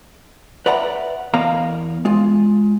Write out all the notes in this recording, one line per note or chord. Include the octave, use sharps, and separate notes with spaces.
B4 D5 E5 F#5 A#5 B5
E2 B3 A#4 D#5 F5 A#5
G#3 F4